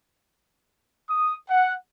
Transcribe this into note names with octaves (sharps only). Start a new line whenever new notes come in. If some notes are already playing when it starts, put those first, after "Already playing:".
D#6
F#5